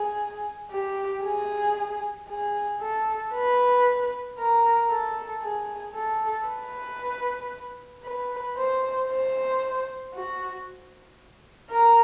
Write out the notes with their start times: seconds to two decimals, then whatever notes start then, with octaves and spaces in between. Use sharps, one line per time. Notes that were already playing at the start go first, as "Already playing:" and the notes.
Already playing: G#4
0.72 G4
1.24 G#4
2.29 G#4
2.81 A4
3.34 B4
4.39 A#4
4.90 A4
5.43 G#4
5.95 A4
6.47 B4
8.04 B4
8.57 C5
9.10 C5
10.14 F#4
11.71 A#4